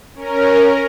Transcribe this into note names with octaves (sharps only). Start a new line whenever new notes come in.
C#4 A#4